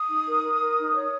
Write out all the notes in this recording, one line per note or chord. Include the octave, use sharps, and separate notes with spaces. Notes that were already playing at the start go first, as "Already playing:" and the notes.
Already playing: D#6
D#4
A#4
A#4
A#4
D#4
C#5